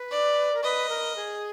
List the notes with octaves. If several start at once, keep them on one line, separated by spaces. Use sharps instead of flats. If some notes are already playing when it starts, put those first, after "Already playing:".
Already playing: B4
D5
A#4
B4 D#5
A#4
G#4